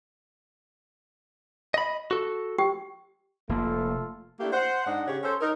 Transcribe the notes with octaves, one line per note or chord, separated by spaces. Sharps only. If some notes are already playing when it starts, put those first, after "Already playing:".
D#5 B5
F#4 A4
G4 G5
F1 A3 A#3 F4 A4
A3 A#3 D4 E4 G4
C5 F#5
G#2 D4 D#5 F#5
C#3 G4 C#5
C#4 A4 C5
D#4 A#4